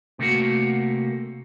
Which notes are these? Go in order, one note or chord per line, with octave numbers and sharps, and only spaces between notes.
C3 A3 A#3 F#4